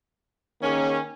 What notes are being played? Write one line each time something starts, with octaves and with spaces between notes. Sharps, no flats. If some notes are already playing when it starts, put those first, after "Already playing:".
D#3 A#3 C#4 G#4